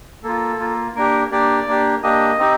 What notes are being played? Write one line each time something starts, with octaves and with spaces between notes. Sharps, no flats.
A#3 F4 A4
A#3 F4
A#3 D4 G4 A#4
A#3 D4 G4 D5
A#3 D4 G4
A#3 D4 G4 D#5
C4 D#4 G4